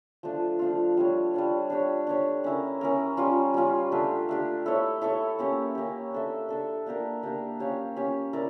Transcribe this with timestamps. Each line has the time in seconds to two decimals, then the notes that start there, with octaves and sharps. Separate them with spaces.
0.23 F3 A3 D4 F4
0.59 F3 A3 D4 F4
0.97 G3 D4 F4 C#5
1.34 G3 D4 F4 C#5
1.70 D4 G4 C#5
2.07 D4 G4 C#5
2.44 C#4 E4 A#4
2.81 C#4 E4 A#4
3.17 G3 C#4 F4
3.54 G3 C#4 F4
3.92 A3 D4 G4
4.29 A3 D4 G4
4.66 E4 A4 C#5 E5
5.01 E4 A4 C#5 E5
5.39 A#3 C#4 G4
5.75 A#3 C#4 G4
6.12 D4 A4 E5
6.49 D4 A4 E5
6.86 A#3 D4 G4 A#4
7.23 A#3 D4 G4 A#4
7.59 C#4 G4 C#5 F5
7.96 C#4 G4 C#5 F5
8.33 E4 A#4 D5